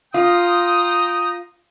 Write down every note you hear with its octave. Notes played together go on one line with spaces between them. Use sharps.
F4 G5 A#5 D#6